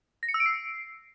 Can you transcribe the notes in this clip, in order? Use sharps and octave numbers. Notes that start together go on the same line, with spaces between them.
A#6
C#7
E6
D7
C7